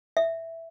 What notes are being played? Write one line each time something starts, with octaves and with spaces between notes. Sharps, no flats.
E5